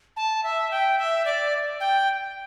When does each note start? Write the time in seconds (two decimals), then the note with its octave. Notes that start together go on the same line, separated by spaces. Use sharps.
0.16 A5
0.43 E5
0.71 G5
0.98 E5
1.25 D5
1.80 G5